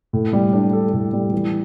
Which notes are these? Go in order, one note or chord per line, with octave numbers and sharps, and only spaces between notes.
A2
G3
D4
A4
A2
G3
E3